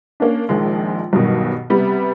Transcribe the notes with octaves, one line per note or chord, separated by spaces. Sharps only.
A#3 C#4 D4
A#1 D#3 F3 G#3
B1 G2 B2 D#3
C3 G3 B3